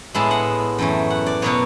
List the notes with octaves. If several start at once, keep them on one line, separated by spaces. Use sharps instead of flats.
A2 G#3 B3 E4 A5
F#5
F#2 E3 A3
F#5
D5
B2 F#3 B3 C#5